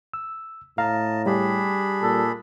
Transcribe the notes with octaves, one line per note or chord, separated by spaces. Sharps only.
E6
A2 D#5 F5 A5 A#5
G3 D4 G4 G#4 B5
A#2 A4